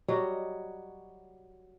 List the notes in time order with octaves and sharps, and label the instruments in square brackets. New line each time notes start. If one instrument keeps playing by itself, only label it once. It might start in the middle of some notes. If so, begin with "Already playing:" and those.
[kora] F#3 G3 D#5